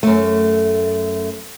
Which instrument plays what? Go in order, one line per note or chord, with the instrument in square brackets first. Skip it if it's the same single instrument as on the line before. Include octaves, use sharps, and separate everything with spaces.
[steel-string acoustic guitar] F#2 A3